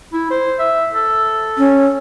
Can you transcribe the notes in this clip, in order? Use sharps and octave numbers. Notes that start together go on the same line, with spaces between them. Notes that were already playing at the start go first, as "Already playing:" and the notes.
E4
C5
E5
A4
C#4